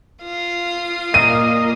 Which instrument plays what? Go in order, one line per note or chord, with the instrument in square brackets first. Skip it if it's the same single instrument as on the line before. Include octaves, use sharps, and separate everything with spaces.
[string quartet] F4 F5 D#6
[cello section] A#2 A#4 [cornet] D#5 [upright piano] D#7